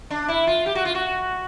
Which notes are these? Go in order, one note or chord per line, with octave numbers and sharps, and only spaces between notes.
D4
E4
F4
G4
F#4
F4
F#4